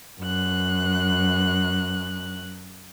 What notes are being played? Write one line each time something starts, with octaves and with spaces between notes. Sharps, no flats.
F#2 F#6